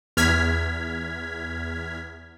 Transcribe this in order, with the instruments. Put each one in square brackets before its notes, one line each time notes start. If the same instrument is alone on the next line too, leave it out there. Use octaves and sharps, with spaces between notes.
[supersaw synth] E2 F6 G#6 B6